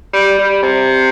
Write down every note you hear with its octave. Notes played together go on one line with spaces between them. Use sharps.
G3
G3
C3